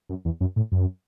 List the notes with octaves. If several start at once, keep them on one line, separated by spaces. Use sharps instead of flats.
F#2
E2
F#2
A2
F#2